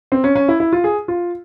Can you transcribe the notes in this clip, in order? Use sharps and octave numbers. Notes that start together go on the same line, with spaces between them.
C4
C#4
C#4
E4
E4
F4
G#4
F4